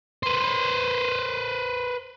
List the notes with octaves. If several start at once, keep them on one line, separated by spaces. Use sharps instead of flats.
B4 C5